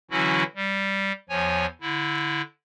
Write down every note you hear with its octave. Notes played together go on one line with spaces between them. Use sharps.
D3 E3 F#3 C#4 E4 F#4
G3
E2 F3 C#5 G#5
D3 E4